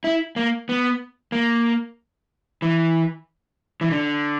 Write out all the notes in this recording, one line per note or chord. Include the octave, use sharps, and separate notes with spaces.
E4
A#3
B3
A#3
E3
E3
D3